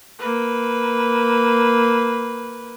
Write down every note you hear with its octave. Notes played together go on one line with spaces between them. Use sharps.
A#3 B4